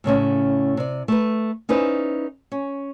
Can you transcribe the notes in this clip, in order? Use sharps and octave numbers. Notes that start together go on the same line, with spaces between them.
A2 C#3 A3 C#4
C3 D5
A3 B4
C#4 D#4 E4 B4 C5 D5
C#4